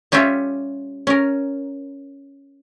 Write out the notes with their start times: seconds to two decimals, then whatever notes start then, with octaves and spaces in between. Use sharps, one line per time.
0.12 G3 C#4 F4 G4 E5
1.07 C#4 A#4